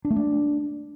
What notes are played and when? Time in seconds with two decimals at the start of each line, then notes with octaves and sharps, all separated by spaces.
0.05 D4
0.10 A3
0.16 D4